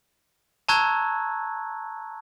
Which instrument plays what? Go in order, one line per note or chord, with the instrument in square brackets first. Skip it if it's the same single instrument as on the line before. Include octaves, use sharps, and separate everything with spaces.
[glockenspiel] A5 A#5 C#6 E6 F#6 G#6